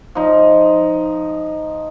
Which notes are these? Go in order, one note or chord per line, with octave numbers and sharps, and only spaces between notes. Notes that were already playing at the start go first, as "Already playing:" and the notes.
F3 D#4